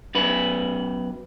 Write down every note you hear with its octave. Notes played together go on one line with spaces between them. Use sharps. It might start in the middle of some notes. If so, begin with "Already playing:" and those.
F#2 B2 B4